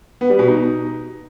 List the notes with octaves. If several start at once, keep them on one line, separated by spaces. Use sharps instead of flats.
B3
G3
B2
D#4